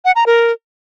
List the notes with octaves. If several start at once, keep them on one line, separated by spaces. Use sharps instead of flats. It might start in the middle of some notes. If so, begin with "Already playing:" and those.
F#5
A#5
A#4